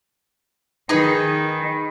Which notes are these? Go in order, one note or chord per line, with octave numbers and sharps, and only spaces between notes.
D#3 D#4 G#4 B4